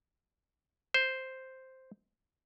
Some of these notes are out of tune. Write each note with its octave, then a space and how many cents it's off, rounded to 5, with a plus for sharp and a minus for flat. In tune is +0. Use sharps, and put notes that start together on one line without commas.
C5 +0